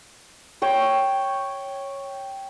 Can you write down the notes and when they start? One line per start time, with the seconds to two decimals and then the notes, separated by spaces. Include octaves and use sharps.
0.62 C#5 G5